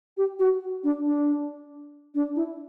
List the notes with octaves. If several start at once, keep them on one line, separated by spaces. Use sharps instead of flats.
G4
F#4
D4
D4
D4
E4